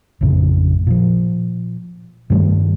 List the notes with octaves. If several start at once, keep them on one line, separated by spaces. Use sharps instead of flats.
A1 F2 A2 C#3
A#2 F3
G2 D#3 G3 A3